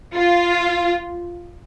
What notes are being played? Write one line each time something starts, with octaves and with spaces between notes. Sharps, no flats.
F4